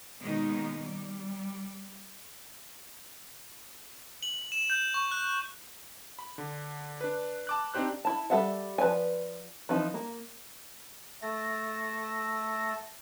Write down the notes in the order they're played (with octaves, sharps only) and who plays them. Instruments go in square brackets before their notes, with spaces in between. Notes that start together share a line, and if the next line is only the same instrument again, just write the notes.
[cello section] B2 D#3 G#3 A#3 C#4 D#4
G3
[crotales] F#7
E7
G6
C#6
F#6
[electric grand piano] B5
D3
D4 B4
A5 D6 F#6
C4 D4 D#4 G4 C5 F#6
[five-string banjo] E4 A5
G3 A4 B4 E5 F#5
F3 B4 D5 G#5
E3 F3 C4 D#4
A#3
[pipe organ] A3 A4 A#6